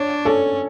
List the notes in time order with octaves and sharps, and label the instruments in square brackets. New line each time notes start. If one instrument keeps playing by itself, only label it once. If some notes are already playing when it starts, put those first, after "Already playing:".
Already playing: [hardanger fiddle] D4 [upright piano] C#5
[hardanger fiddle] C#4 [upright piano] A4